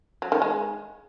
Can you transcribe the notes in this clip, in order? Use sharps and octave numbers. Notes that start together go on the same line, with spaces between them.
F#3
D#3
G#3